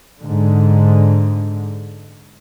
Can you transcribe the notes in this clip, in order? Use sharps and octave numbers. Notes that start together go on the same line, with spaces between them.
G#2 D3